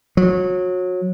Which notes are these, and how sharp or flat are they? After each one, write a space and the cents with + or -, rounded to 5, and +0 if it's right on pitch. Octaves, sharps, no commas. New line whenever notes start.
F#3 -25